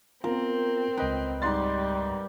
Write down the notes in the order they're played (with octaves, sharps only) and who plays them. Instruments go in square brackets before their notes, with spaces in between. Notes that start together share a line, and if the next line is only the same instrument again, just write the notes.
[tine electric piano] B3 F4 [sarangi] C4 [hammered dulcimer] A#4
[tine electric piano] C#2 D#5 G5 [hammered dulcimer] B4
[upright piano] G#2 C6 A6 [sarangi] G3